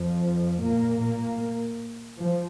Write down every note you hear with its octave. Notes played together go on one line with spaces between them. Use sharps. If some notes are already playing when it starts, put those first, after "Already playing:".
Already playing: F2 F3
A#2 A#3
A#2 A#3
F3